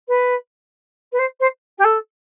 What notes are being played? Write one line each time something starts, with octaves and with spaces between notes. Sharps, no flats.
B4
B4
C5
C5
G4
A4